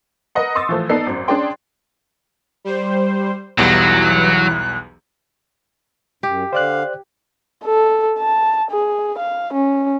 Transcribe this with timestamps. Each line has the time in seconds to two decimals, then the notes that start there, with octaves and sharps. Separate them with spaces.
0.35 A#4 B4 D#5 F#5
0.55 C6 C#6 D#6 E6 A6
0.69 E3 F3 A3
0.89 B3 D#4 A4 D5 C7
1.07 G#1 F#2
1.28 C#4 D4 G#4 D5 G5 C6
2.64 G3 C5
3.58 B1 E2 E3 F#3 G3 F#6
6.23 F#2 G4
6.53 D3 C5 D5 F5 F#6
7.65 A4
8.18 A5
8.71 G#4
9.18 F5
9.53 C#4